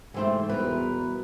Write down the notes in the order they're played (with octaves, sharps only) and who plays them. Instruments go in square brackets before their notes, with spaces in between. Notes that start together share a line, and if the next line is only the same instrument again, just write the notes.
[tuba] G#2 [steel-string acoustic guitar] C3 C4 [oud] E3 A3 C5
[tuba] E2 [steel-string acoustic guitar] B2 A#4 B4 [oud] G3